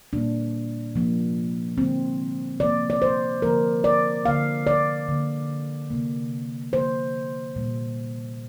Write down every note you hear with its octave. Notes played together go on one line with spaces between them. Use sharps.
A#2 G3 A#3 D4
C3 F3 A#3
D3 G3 A#3 C4
C3 F3 A#3 D5
D5
C5
D3 F3 A#3 A#4
D5
D3 A#3 F5
D5
D3 A#3
C3 A#3
D3 F3 A#3 C5
A#2 G3 A#3